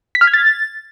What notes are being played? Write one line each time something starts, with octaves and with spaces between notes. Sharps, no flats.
B6
F6
G#6
A6